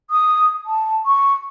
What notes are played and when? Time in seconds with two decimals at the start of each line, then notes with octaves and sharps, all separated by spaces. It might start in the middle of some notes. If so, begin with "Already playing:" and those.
0.10 D#6
0.66 A5
1.06 C#6